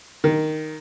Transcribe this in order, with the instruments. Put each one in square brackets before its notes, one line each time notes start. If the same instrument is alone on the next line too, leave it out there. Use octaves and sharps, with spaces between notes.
[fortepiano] D#3